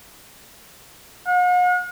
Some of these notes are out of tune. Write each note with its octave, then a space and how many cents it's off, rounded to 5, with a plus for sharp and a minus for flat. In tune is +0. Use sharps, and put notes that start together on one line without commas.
F#5 -45